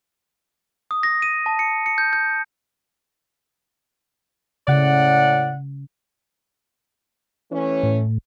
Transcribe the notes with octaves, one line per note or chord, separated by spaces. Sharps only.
D#6
A#6
D#7
A5
C#7
C#7
G6
G6
A2 C#3 D5 F#5
E3 A3 C#4
A2